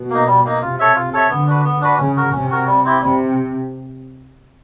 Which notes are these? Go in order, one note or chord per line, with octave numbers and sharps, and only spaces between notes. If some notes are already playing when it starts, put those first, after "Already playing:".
Already playing: B2
A#3 D#4
G3
A#3 D#4
C3 F4
A4 C#5 E5
F4
A4 C#5 E5
D3 B3
D4 F#4 B4
B3
D4 F#4 B4
C#3 C#4
F#4 A#4
C3 C#4
F#4 A#4
G3
C4 E4 G4
C3 G3